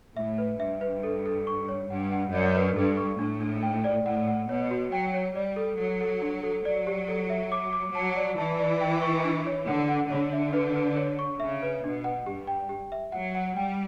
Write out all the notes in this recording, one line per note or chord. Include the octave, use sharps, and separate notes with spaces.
A2 E5
B4
G2 E5
B4
A4
A4
C#6
C#5
G2 F#5
F#5
F#2 D5
B4
G2 A4
C#6
A2 D4
D4
G5
D5
A2 F#5
F#5
B2 C#5
F#4
F#3 G5
C#5
G3 D5
A4
F#3 A4
A4
D4
A4
F#3 D5
G4
A4
E5
D6
D6
F#3 A5
D5
E3 A5
D5
G5
C#6
D4
C#5
D3 F#5
F#5
D3 C#5
E5
B4
B4
C#5
C#6
C#3 E5
B4
B2 D4
F#5
G2 G4
G5
G4
E5
F#3 F#5
F#5
G3 G5